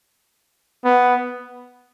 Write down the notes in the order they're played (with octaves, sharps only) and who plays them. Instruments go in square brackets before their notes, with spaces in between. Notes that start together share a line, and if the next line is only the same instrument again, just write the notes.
[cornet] B3